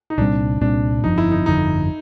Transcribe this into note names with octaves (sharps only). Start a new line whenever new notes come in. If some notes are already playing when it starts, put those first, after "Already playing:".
D#4
C2 A#2 G3 C4 D4
C2 A#2 G3 C4 D4
G1 F2 D3 F3 D#4
E4
D#4
G1 F2 D3 F3 D#4